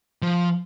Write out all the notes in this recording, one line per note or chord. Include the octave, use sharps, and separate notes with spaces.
F3